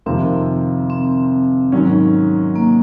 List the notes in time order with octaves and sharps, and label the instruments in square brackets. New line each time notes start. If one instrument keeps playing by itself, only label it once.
[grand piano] F2 C3 D#3 A#3 F4 [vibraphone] C4
[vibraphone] C4
[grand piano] G#2 D#3 F#3 C#4
[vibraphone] A#3